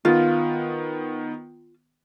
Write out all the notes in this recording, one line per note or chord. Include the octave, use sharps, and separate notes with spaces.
D#3 B3 F4